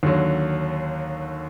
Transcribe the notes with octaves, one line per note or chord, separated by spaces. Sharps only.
D#2 D3 F#3